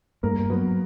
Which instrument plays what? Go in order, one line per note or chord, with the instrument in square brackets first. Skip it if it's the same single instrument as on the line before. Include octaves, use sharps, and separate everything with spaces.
[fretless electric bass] G2 [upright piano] A#3 A#4
[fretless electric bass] F#3 [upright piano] B3 B4